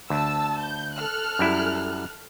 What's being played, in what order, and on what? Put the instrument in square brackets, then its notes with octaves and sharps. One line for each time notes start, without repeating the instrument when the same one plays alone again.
[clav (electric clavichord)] D2 [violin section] A5 E6
[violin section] G6
A4 F6 F#6
[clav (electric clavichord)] F#2 G3 E4